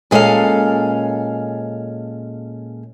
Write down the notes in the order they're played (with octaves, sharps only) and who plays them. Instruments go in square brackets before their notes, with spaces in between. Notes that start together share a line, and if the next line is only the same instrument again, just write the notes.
[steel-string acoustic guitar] A#2 G#3 C#4 A4 F5